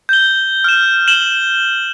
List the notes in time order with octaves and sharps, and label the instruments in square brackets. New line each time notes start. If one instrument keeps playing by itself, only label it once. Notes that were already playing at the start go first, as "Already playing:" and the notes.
[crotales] G6 G7
F6 E7
E7 F#7 G7